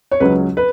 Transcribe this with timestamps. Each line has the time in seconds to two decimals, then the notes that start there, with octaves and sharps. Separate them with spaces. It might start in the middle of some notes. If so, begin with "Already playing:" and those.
0.11 C#5
0.20 C#2 C#3 F#3 C#4 B4
0.57 B4